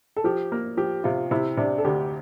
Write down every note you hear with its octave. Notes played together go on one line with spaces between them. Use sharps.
A4
F3 G4
A#3
F3 G4
C3 F4
C3 E4
C3 D4
A4
D2 G4